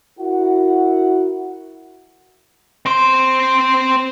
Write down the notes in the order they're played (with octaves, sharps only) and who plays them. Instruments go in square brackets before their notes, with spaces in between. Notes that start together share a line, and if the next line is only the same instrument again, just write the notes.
[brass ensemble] E4 F#4 A#4 F#5
[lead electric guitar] C4 C5